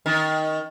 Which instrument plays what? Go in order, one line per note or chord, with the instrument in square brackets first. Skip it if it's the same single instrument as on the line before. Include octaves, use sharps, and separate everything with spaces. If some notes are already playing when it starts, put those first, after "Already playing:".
[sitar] D#3